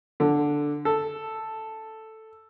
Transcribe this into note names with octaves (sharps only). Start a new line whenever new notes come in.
D3
A4